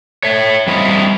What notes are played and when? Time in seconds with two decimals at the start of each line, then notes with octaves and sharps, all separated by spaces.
0.23 C#5 E5
0.67 G3 C4 E4 D#5 F5